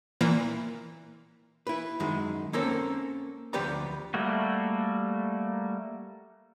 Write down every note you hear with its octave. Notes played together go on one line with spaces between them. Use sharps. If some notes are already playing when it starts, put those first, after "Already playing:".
A#2 E3 A#3
E4 B4
F#2 D#3 G#3
A#3 C4 C#4 A4 A#4 C5
D2 F3 G4 B4 D5 A#5
G3 A3 A#3 F#4